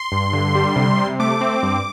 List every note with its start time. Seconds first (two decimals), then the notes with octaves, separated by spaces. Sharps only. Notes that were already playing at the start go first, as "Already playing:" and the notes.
Already playing: C6
0.12 G2
0.33 D3
0.55 G3
0.76 C3
0.98 C3
1.20 A3 D6
1.41 C4
1.63 G2